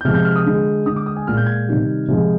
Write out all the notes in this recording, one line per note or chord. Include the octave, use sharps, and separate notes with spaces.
G6
C3 F3 G#3 F6
G6
F6
D#6
D3 G#3
D3 G#3 D#6
D6
D#6
G#5
A#2 G#3 F6
G6
G#6
C3 D#3 G3
C3 F3 G#3